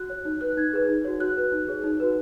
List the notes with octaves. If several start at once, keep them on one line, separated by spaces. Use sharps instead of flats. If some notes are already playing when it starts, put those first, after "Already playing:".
Already playing: F#4 F#6
C#5
D#4
B4 F#6
D#4 G#6
G#4 B4
D#4
F#4 C#5
F#4 F#6
B4
D#4
G#4 C#5
D#4
F#4 B4